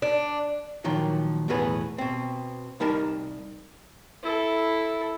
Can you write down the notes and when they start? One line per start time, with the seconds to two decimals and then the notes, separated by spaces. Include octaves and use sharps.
0.02 D4
0.84 A#2 D#3 F3 F#3
1.48 B1 E2 A2 B3 G#4 B4
1.98 B2 C4
2.80 C2 G3 D#4 A#4 A5
4.23 E4 A4